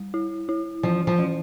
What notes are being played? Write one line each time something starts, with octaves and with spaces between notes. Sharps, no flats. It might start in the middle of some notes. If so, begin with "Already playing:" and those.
Already playing: G3
E4
E4
E3 F3
F3
E3